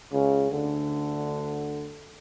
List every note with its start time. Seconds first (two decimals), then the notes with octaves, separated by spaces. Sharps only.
0.12 C#2 C#3
0.51 D2 D3